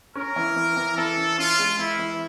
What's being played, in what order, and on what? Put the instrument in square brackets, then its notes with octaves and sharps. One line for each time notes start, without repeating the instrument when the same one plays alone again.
[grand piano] C#4 [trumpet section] A#4
[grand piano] E3
E3
E3
[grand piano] E3 [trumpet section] A4
[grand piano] C#4
[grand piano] C#4 [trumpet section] F4
[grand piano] G#3
[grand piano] E3 [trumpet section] E4
[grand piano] E3